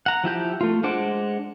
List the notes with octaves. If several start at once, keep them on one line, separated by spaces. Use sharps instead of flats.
F#5 A#5
F3 E4 G4 G6
A3 F4
G#3 D4 C5 F#5 D6